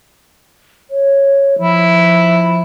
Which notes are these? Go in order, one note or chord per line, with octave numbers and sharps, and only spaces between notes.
C#5
F3 E4